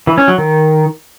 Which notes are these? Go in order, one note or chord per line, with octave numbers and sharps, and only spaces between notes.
E3
C#4
F#3
D#3